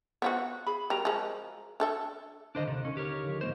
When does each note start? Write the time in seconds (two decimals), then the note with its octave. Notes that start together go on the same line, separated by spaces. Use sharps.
0.22 B3 F4 F#4 C5 E5
0.66 G#4 B5
0.90 G3 F#4 A#4 A#5
1.05 F3 G#3
1.80 D4 A4 E5
2.55 D#2 D3 D4 C5 D#5
2.67 C3
2.85 D#2 C#4
2.97 G4 A#4 C#5
3.23 D3 F3
3.41 G#2 A#3 B3 C5 D#5 C6